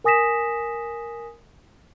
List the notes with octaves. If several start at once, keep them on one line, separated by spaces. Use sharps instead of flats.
A#4 G#5 D#6 A#6 B6 E7